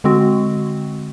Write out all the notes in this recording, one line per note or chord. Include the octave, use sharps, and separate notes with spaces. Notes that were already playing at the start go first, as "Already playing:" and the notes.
D3 G#3 C4 F#4